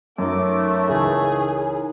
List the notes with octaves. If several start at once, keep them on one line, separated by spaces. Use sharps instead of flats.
F#2 A3 D#4 A#4 C#5 D6
C#2 E3 G#4